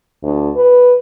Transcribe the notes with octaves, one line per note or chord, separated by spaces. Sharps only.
D2
B4